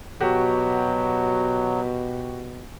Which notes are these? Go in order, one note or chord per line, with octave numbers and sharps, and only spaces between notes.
B2 F#3 F#4 G4